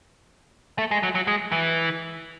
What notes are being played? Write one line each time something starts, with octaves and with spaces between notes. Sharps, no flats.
A3
G#3
F#3
F#3
G#3
E3